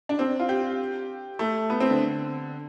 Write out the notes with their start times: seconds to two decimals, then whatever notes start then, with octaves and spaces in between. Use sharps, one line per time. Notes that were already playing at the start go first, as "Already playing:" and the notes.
0.09 D4
0.19 C4
0.40 F4
0.49 G4
1.39 A3
1.70 B3
1.80 C4
1.90 D3